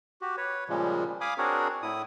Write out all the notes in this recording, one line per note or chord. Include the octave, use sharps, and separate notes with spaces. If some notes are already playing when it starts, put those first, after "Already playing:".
F#4 G4
B4 C#5
A#2 C#3 F3 G3 G#3
F5 G#5 B5 D6 D#6
C4 D4 F#4 G#4 A#4 C#5
A2 E4 D#6